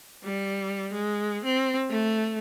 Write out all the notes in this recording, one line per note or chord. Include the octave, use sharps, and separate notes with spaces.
G3
G#3
C4
A3